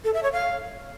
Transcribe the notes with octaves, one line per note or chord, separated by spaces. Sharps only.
A4
E5
C#5
F5